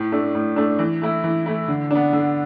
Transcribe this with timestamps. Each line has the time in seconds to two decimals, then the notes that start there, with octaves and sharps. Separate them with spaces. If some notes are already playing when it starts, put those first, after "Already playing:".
Already playing: A2
0.12 A3 D4
0.35 A2
0.56 A3 D4
0.79 E3
1.02 A3 E4
1.24 E3
1.46 A3 E4
1.68 D3
1.91 B3 D4
2.13 D3